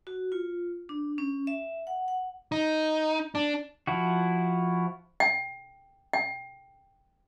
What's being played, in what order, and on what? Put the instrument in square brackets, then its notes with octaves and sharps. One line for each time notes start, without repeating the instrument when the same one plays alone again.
[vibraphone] F#4
F4
D4
C#4
E5
F#5
F#5
[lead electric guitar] D#4
D4
[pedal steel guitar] F3 E4 F#4
[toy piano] G5
G5